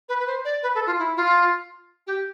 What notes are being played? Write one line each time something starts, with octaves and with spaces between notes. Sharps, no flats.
B4
B4
C5
D5
B4
A4
F4
E4
F4
G4